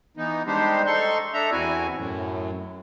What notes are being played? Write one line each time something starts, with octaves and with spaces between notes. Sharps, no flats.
E3 B3 D#4
G3 G#3 D4 D#4 G4 C5
D#4 A4 C6 C#6
D4 A4 E5 A#5
E2 C4 E4 F#4 G#5
F#2 A2